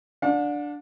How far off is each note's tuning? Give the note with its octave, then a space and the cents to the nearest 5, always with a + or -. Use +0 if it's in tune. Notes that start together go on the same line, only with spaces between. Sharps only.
D4 +0 F#5 -45